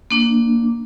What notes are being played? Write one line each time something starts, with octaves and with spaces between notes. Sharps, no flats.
A#3 D4